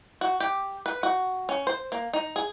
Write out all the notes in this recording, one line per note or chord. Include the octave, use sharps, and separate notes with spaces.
F#4
G4
B4
F#4
C#4
C5
A#3
D#4
G#4